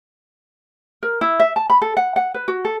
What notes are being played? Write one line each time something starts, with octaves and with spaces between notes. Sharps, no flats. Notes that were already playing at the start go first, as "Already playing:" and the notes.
A#4
E4
E5
A5
B5
A4
F#5
F#5
B4
F#4
A4